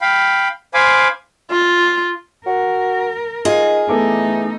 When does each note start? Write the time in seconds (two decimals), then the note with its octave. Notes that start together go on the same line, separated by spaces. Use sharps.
0.01 F5 G5 B5
0.74 C5 F5 G#5 B5 D6
1.51 F4
2.46 F#4 A#4
3.45 D#4 F4 G#4 F5
3.89 E3 A3 B3 D#4 A4 D6